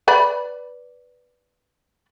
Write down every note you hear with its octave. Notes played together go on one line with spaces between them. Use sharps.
B4 D5 B5